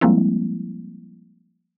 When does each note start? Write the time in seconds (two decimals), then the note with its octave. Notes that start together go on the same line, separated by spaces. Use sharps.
0.01 F3 G3 G#3 A#3 C4 E4